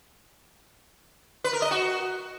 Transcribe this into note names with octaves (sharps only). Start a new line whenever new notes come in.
B4
A#4
D#5
F#4